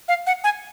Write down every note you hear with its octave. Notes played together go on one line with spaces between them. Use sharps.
F5
F#5
G#5